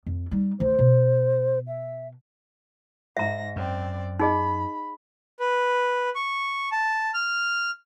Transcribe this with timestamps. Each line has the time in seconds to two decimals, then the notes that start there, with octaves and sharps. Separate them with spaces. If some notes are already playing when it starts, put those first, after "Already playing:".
0.06 F2
0.31 G3 D#4
0.60 D2 E3 C5
0.79 B2
1.67 E5
3.17 G#2 E5 A#5 A#6
3.56 F#2 C4 D5
4.20 D#4 G#4 D#5 B5
5.40 B4
6.15 C#6
6.72 A5
7.14 F6